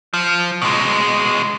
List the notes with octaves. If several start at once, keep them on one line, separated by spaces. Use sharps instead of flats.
F3
B2 G#3